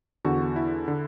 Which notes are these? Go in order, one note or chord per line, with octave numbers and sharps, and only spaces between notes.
E2 D3 F#4
E4
D3